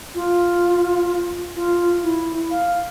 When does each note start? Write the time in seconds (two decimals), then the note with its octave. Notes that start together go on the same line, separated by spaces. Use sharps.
0.15 F4
1.55 F4
2.03 E4
2.51 F5